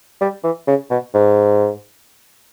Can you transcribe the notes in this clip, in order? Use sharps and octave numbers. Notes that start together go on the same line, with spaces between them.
G3
E3
C#3
B2
G#2